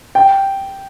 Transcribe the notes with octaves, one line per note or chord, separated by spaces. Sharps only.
G5